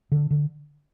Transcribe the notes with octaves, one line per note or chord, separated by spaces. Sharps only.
D3
D3